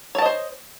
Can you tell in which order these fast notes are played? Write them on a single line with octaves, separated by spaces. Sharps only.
C#5 A5 D#5 C5